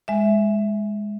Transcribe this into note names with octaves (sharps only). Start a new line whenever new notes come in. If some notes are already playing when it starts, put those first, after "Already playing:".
G#3 E5